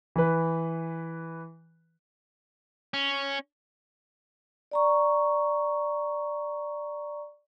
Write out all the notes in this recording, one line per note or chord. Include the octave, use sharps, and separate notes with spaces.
E3 B4
C#4
D5 A#5 C#6